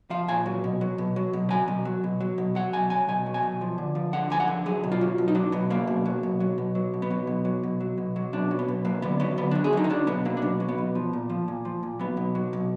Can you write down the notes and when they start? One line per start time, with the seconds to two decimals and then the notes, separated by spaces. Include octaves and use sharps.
0.10 F3 F5
0.28 A#2 G#5
0.46 F#3
0.64 B2
0.81 F#3
0.98 B2
1.16 F#3
1.33 B2
1.50 F#3 G#5
1.68 B2
1.85 F#3
2.04 B2
2.20 F#3
2.38 B2
2.55 F#3 F#5
2.73 B2 G#5
2.90 F#3 G#5
3.08 B2 G#5
3.26 F#3
3.34 G#5
3.43 B2
3.61 F3
3.78 D3
3.95 F3
4.13 D3 F#5
4.30 F3 G#5
4.40 F#5
4.47 D3
4.66 F#3 G#4
4.84 B2
4.92 F4
5.01 F#3
5.18 B2
5.28 D#4
5.35 F#3 D4
5.52 B2 B3
5.70 F#3 A#3
5.87 B2
6.05 F#3
6.23 B2
6.40 F#3
6.58 B2
6.75 F#3
6.94 B2
7.02 B3
7.11 F#3
7.27 B2
7.45 F#3
7.63 B2
7.80 F#3
7.98 B2
8.16 F#3
8.33 B2 D4
8.51 F#3
8.59 B3
8.68 B2
8.85 F#3 A#3
9.02 D3 B3
9.20 F#3 B3
9.38 D3 B3
9.51 F#3 D4
9.64 G#4
9.73 D3 D#4
9.84 D#4
9.90 F#3 D4
10.07 B2 B3
10.25 F#3 A#3
10.37 D4
10.42 B2 B3
10.60 F#3
10.68 B3
10.78 B2
10.95 F3
11.13 A#2
11.29 F3
11.48 A#2
11.65 F3
11.83 A#2
11.99 F#3 B3
12.17 B2
12.35 F#3
12.53 B2